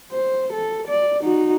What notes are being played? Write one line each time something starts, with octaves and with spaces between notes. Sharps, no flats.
C5
A4
D5
D#4 F#4